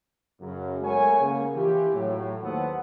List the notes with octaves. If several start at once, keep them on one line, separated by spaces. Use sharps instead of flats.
F#2 C#3
G#3 A3 B3 A#4 C#5 G#5
C#3 A#3
E3 F4 G4
A2 F#3
D#2 B3 A4 B4 C5 F#5